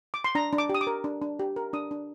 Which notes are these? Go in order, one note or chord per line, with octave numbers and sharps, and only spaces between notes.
D6
C6
D4 A#5
D4
D6
G4
D#6
D6
A#4
D4
D4
G4
A#4
D4 D#6
D4